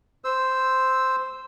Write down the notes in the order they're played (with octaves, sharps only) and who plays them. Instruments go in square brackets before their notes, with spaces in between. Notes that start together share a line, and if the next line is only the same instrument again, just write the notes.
[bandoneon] C5 E6